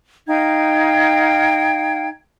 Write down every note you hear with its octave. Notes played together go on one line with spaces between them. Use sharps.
D#4 F5 G5 G#6